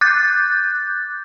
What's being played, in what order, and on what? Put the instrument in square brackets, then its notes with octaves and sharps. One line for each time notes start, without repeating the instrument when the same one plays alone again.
[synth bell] D6 F#6 G6 A6